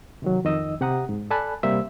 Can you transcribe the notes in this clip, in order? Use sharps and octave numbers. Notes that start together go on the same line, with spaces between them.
C3 D#3 F#3
F2 D#3 D#4 D#5 E6
C3 G4 F#5 A#5 D#6
G#2
A4 D5 G#5 A5 B5 F#6
C3 G3 A#3 C5 E5 E6